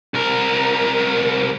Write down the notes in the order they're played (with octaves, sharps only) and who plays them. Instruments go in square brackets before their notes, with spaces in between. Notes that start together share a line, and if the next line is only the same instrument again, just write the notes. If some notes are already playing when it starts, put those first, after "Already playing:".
[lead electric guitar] C2 A#4